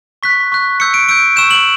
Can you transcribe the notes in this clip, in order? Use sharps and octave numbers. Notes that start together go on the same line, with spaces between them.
C#6 F#6 B6
C#6 F#6
C#6 E6 G6 C#7
D7
C#6 E6 G6 D7
C#6 E6 G6 E7
F#7